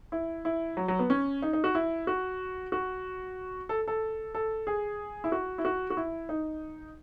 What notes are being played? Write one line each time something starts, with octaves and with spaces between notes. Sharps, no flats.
E4
E4
F#3
F#3
B3
C#4
D#4
D#4
F#4
E4
F#4
F#4
A4
A4
A4
G#4
E4
F#4
E4
F#4
F#4
E4
D#4